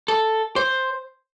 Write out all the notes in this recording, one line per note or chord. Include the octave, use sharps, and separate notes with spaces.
A4
C5